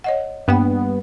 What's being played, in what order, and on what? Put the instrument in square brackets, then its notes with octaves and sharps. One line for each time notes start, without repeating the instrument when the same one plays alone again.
[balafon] C#5 D#5 F#5
[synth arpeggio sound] G2 B3 [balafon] A#3 G5